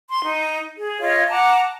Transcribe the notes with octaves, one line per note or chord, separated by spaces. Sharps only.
C6
D#4
G#4
F4 C#5 D#5 F5
F#5 A5 A#5 D6